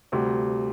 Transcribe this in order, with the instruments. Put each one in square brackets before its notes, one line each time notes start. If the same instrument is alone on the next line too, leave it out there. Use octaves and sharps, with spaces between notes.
[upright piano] D2 C3 G3